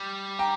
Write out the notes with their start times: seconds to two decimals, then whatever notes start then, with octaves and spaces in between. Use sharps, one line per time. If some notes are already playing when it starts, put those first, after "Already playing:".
Already playing: G3
0.39 G5 A#5